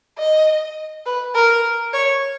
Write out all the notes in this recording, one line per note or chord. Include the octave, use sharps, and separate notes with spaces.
D#5
B4
A#4
C#5